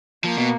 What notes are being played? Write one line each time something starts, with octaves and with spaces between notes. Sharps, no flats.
F3 A#3
B2